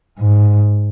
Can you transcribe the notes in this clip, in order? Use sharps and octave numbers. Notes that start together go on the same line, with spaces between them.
G#2